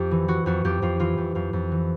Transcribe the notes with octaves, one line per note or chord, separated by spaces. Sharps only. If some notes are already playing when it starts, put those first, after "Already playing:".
Already playing: F2 G4
E3
E3 F#4
F2 F#4
F2 G4
F2 F4
E3 F4
F2
F2 F4
F2
E3